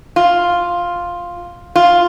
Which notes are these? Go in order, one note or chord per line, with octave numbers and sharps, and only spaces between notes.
F4
F4